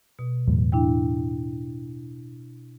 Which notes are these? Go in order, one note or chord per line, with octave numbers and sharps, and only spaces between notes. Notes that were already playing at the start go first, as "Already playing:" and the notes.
B2
E2 A2 F#3
D4 E4 G5